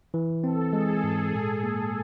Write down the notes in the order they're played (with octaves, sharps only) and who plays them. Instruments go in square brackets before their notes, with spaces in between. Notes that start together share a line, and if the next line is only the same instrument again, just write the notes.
[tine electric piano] E3
[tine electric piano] C4 [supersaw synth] A4
[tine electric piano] G#3 [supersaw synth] G#4
[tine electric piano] G#2
A#2
A#3